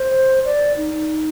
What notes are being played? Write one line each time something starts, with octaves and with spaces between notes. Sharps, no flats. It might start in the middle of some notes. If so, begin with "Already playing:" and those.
Already playing: C5
D5
D#4